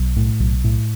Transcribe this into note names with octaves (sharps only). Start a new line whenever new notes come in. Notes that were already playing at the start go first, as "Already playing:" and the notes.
Already playing: B1
A2
B1
A2